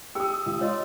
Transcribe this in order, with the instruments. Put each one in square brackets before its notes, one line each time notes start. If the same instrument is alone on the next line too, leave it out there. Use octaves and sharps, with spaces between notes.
[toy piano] G4 G5 [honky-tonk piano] D#6 E6
[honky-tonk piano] C#2
[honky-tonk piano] F4 [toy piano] C#5 D#5 C6